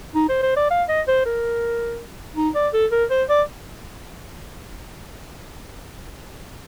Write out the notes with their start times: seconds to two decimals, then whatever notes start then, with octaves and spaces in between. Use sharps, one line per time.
0.15 D#4
0.29 C5
0.43 C5
0.57 D5
0.70 F5
0.89 D#5
1.08 C5
1.26 A#4
2.37 D#4
2.55 D5
2.73 A4
2.92 A#4
3.10 C5
3.29 D5